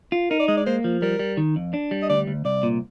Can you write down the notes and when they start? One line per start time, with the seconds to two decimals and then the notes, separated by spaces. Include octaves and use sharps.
0.12 F4
0.30 D#4 A#4
0.40 D5
0.48 G#3 D#5
0.57 D5
0.66 A#3 C5
0.84 F3
1.02 G3 A#4
1.19 G3
1.37 D#3
1.56 F2
1.74 D4
1.91 G3
2.02 D#5
2.09 D2 D5
2.27 D2
2.45 C2 D5
2.63 A#2